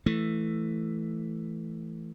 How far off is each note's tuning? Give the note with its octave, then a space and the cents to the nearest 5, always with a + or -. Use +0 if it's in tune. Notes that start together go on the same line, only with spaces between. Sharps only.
E3 +5 A3 +0